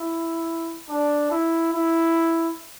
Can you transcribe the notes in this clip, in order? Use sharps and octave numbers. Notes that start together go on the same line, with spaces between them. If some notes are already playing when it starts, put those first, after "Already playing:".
Already playing: E4
D4
E4
E4